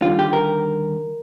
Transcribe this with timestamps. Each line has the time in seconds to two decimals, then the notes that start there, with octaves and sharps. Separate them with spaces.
0.02 D#2 D3 G3 F4
0.19 G4
0.33 A#4